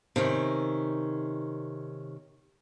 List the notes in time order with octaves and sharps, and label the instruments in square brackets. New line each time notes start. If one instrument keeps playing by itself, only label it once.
[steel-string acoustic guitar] C3 D#3 C#4